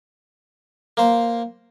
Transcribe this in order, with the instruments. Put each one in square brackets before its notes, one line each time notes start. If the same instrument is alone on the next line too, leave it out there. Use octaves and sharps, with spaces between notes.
[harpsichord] A#3 C5